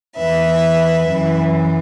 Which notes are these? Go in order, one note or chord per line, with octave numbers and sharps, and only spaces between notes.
E2 E3 B4 E5
F#2 E3